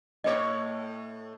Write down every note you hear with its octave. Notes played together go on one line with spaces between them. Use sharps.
A2 A3 C#5 D#5